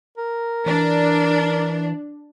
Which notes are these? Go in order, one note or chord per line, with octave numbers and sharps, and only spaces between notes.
A#4
E3 D4